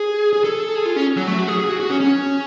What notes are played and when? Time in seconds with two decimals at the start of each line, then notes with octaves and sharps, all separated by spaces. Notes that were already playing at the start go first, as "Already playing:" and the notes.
Already playing: G#4
0.33 G#4
0.44 A4
0.75 G#4
0.85 F4
0.96 C#4
1.17 F#3
1.27 A3
1.38 F#4
1.48 G#4
1.59 G#4
1.69 F#4
1.80 F#4
1.90 C#4
2.01 C#4